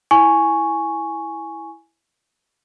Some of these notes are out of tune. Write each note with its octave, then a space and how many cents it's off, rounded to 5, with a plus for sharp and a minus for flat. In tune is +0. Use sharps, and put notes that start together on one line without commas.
E4 +0 G#5 +0 C#6 +0